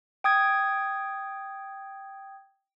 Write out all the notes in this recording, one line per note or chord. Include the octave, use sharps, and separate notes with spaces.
G5 D#6 G#6